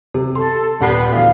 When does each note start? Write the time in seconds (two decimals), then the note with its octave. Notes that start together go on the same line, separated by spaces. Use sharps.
0.14 C3
0.35 A4 C6
0.81 D#1 G3 B3 F#5 B5 C7
1.12 D2 E3 F5